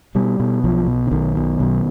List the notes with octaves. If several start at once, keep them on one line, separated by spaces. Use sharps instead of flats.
B2 G3
B2
B1 F3
B2
D3
B1 D#3
B2
B1